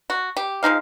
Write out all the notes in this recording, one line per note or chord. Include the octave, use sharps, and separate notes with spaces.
F#4
G4
F3 G#3 D#4 F5